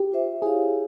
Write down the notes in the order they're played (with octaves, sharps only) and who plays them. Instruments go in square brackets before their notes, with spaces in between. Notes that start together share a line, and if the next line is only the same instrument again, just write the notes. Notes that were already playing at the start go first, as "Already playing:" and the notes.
Already playing: [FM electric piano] G4
[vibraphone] F4 C5 E5
[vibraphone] E4 G4 C#5 F5 [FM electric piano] G#4